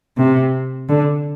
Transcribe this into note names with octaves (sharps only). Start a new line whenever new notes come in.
C3
D3